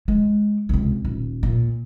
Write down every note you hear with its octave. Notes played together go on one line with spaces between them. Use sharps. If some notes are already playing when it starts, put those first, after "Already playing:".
G#3
C#2 C3
D#1
A#2